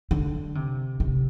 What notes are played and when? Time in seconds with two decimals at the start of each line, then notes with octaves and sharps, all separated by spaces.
0.11 D3
0.55 C3
1.00 C3